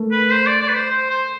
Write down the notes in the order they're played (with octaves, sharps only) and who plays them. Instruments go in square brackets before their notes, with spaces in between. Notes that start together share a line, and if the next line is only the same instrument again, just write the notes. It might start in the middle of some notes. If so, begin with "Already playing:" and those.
Already playing: [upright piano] A3 A4 A#4
[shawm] B4
C5
D5
D5
B4
C5
C5
C5